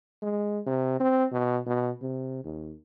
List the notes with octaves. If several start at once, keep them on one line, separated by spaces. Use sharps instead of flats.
G#3
C3
C4
B2
B2
C3
D#2